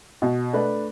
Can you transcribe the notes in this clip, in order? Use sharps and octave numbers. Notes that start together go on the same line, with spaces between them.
B2
A3 D4 B4